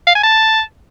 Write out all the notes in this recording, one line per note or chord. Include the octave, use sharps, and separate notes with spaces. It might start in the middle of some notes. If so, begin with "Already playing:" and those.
F5
G#5
A5